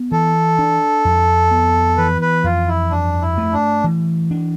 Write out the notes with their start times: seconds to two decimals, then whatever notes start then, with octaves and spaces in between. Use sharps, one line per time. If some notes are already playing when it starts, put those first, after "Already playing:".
Already playing: B3
0.12 E3 A4
0.59 D4
1.05 F2
1.51 B3
1.98 E3 B4
2.21 B4
2.44 F2 F4
2.68 E4
2.90 G2 D4
3.21 E4
3.38 A3
3.53 D4
3.84 E3
4.31 D4